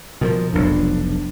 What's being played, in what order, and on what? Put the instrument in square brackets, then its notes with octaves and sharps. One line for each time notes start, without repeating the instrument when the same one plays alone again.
[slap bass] B2 E3 F3 [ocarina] A#4
[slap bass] F1 B1 F2 [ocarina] D4